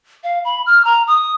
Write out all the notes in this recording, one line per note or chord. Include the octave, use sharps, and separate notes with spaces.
F5
B5
F6
A#5
D#6